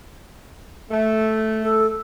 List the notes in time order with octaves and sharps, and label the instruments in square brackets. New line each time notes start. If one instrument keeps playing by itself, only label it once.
[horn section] A3
[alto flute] A4